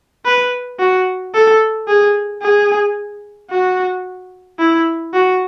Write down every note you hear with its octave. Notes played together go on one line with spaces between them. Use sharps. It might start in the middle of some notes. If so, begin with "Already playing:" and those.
B4
F#4
A4
G#4
G#4
F#4
E4
F#4